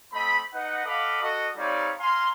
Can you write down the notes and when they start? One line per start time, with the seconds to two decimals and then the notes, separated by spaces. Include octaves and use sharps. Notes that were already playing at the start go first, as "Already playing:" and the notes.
0.14 A3 C4 D#5 B5
0.54 D#4 B4 D#5 F#5
0.85 A4 D#5 F5 F#5 B5 D6
1.22 F#4 A4 D#5
1.57 G3 C4 D#4 C#5 D5 F5
2.00 F5 G#5 A#5 C6